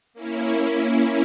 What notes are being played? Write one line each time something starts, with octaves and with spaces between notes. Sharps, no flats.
A#3 C#4 E4